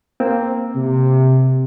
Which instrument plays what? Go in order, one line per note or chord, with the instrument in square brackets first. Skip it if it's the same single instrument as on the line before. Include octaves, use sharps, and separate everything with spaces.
[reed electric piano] A#3 C4
[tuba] C3